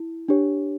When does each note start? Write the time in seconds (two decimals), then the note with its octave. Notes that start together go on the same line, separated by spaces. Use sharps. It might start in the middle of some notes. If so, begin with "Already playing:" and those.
Already playing: E4
0.29 D4 G4 C#5